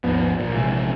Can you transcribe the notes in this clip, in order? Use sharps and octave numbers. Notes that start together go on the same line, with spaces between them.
G#1 D#2 F3 B3
A#1 A#2
A#1 C3 E3 G#3